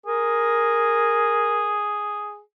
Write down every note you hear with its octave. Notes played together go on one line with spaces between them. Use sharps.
G#4 A#4